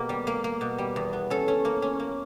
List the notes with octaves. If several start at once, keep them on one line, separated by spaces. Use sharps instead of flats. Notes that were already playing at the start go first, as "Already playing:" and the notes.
Already playing: B2 A#3 G4
G3
A#3
A#3
B2
G3
E2
B3
C#4 A4
C#4
A#3
C#4
A#3